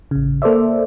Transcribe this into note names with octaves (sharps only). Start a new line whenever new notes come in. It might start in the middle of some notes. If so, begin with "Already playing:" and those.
A1 C#3
A#3 A4 C5 D5 E5